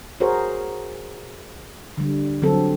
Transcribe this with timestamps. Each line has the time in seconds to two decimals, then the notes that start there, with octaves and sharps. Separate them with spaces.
0.20 F#4 G#4 A#4 C5 C#5
1.97 D3 G3
2.42 D3 F#3 G3 C4 A4